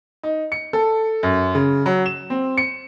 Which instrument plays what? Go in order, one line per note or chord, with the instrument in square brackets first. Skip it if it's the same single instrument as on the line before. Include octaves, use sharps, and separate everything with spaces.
[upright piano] D#4
C#7
A4
F#2
C#3
F#3
E7
C4
C#7